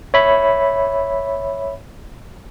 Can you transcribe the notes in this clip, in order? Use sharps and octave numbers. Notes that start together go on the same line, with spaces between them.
C#5 E5 B5